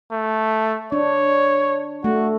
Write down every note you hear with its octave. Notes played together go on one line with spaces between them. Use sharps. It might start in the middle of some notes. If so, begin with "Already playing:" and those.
A3
D4 C#5
A3 F#4